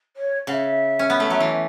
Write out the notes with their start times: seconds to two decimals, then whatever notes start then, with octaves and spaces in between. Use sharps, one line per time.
0.16 C#5
0.47 C#3 F#5
0.52 E5
0.99 C#4
1.10 B3
1.20 A3
1.30 F#3
1.40 E3